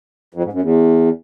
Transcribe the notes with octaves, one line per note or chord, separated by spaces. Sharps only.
F2
G#2
F#2
E2